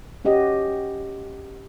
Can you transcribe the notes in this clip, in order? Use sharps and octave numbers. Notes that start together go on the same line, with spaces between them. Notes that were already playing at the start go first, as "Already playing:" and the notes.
C#4 F#4 G4 D#5